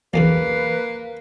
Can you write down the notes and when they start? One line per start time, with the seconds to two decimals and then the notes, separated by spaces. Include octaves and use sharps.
0.14 B1 E2 C#3 A#3 B4